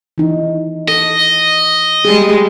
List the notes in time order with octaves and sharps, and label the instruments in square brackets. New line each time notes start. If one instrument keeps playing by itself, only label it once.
[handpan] E3 D#4
[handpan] A4 [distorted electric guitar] D#5
[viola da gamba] G3 G#3 [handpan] G#4